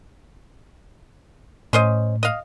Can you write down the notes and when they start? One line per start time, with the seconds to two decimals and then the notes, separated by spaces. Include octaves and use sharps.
1.73 A2 C#4 C5 D#5
2.23 D#5 F5